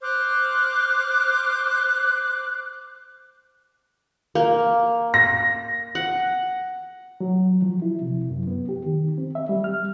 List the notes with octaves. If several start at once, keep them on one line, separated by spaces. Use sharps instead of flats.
C5 D6 F6 F#6
A#3
A#6
F#5
F#3
F3
E4
C3
F#2
B3
G4
D#3
C4
E5
G3
F6